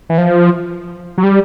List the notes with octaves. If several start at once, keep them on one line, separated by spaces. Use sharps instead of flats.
E3
F3
F#3
G3